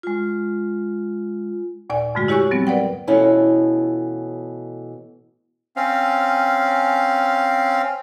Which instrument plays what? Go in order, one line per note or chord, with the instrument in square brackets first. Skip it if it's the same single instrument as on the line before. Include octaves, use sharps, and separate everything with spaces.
[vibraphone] G#3 F4
[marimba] D#2 A#2 D5 G#5
F2 G#2 D3 G#3 A3 F#4
E4 G4 C#5 G#5 C#6 F#6
F#3 G3 B3 C4
A#4 B4 D5 F#5 G5
[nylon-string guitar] B2 E3 A3 C#4 E4 F4
[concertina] C4 C#4 F5